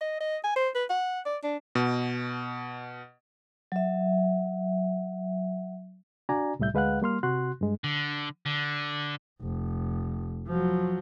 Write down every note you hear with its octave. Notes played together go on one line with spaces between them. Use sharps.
D#5
D#5
G#5
C5
B4
F#5
D5
D4
B2
F#3 E5
D4 F#4 D5 G#5 A#5
C2 A2 G3 E5 G6
D2 G#3 B4 F5 F#5 F#6
G3 A#3 C6 F6
C3 F#4 C6 F#6
G2 G#3
D3
D3
F1
F3 F#3